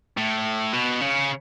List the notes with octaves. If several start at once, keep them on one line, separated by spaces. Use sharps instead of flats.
A2
B2
C#3